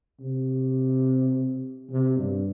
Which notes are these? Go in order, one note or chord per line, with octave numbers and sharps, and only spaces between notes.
C3
C3
G2